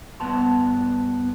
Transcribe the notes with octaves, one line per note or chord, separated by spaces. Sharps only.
G2 B3 A5 C6